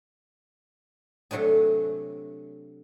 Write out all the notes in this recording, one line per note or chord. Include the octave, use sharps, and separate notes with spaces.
C3 F#3 A3 D4 G#4